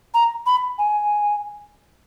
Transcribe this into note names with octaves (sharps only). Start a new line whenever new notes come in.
A#5
B5
G#5